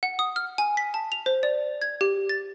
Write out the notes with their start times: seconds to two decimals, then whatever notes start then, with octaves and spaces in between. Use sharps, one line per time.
0.03 F#5
0.19 D#6
0.36 F6
0.58 G#5
0.77 B6
0.94 A5
1.12 F7
1.26 C5
1.43 D5
1.82 G#6
2.01 G4
2.29 A6